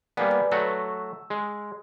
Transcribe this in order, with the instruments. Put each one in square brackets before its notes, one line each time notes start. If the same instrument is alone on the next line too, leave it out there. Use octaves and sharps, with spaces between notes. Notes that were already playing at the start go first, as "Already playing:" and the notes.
[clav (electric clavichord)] G3 A#3 B3 [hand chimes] D5 G#5 B5
[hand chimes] B4
[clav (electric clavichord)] F#3 A3 F#4 [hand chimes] E6
[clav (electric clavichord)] G#3